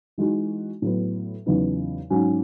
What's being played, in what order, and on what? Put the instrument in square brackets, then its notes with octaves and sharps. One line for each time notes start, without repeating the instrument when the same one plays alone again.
[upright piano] E3 G#3 D#4 F#4
A2 F#3 B3
E2 C#3 F#3 B3 D#4
G#2 F#3 C#4 F#4